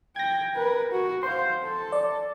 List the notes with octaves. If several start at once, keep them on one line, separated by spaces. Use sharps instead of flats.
G5 G#6 A#6
A#4 B4
F#4
C5 F5 C6
A4 A5
D5